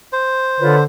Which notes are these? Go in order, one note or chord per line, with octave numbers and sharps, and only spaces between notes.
C5
D3 F4 B4 C#5